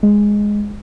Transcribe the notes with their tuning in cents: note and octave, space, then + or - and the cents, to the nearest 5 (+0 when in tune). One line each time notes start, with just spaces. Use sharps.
G#3 -5